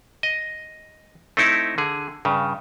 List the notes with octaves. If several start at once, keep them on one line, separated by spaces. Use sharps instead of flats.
D#5
A3 C4 D#4 E4
D3 G#4
G2 C#3